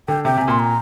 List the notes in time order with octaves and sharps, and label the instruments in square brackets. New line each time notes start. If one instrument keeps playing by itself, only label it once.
[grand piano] D3 [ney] G5
[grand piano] C3 [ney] G5
[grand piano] C3 [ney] G#5
[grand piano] A#2 [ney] C6
[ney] A#5